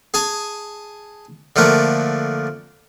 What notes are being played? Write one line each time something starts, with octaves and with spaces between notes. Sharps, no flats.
G#4 G#5 A5
D3 F3 A3 A#3 F#5